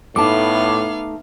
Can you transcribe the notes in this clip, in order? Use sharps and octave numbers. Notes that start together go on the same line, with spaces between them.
A2 A3 B3 D#4 F5 A5 D6